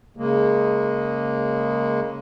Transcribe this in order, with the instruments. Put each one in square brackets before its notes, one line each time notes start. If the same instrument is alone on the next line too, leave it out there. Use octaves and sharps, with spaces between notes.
[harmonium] C#3 G#3 A#3